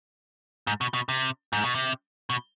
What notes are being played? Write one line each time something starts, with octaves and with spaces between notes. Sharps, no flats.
G#2
B2
B2
C3
G#2
B2
C3
B2